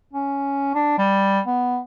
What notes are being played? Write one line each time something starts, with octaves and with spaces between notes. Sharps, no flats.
C#4
D4
G3
B3